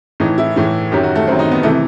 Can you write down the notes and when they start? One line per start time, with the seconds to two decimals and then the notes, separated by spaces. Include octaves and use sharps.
0.20 A2 E3 D#4
0.38 E4
0.56 A2 E3
0.92 F#2 D#3 F#3 G4
1.03 F#4
1.15 A3
1.27 F#2 D#3 F#3 C4
1.39 D#4
1.51 B3
1.63 C3 E3 A3